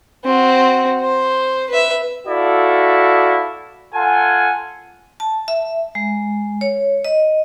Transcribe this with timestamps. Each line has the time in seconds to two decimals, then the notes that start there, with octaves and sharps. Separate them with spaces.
0.25 C4 F#4
1.01 C5
1.69 B4 E5
2.27 E4 F#4 A4 D5 F5
3.94 F4 A4 F#5 G#5
5.20 A5
5.48 E5
5.95 G#3
6.61 C#5
7.05 D#5